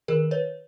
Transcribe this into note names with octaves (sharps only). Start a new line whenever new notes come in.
D#3 G#4 A#4
B4 C#5